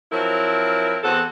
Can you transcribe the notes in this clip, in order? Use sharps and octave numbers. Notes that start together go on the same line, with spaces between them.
F3 F#3 C4 E4 A#4
E2 C4 F#4 A4